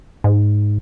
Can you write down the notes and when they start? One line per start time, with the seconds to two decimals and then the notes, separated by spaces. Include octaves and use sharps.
0.24 G#2